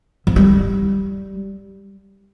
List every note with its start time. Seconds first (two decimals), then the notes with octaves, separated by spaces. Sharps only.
0.27 F3
0.36 G3